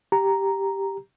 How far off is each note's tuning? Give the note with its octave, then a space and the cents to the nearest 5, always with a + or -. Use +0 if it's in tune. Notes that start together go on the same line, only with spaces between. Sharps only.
G4 +0 A#5 +0